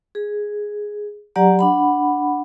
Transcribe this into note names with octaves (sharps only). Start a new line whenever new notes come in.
G#4
F#3 G4 D5 F#5 A#5
D4 F#5 B5